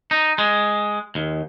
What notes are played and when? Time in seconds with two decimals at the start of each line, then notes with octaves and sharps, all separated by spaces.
0.11 D#4
0.38 G#3
1.15 D#2